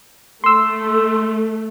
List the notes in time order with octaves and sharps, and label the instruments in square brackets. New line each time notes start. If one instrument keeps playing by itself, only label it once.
[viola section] A3 [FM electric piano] C6 E6